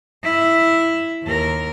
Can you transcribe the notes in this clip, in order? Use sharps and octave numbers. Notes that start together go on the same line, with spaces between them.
E4 E5
D#2 A#4